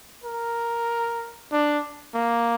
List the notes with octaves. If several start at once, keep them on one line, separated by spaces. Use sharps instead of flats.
A#4
D4
A#3